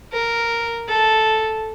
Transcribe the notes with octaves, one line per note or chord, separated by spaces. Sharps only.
A#4
A4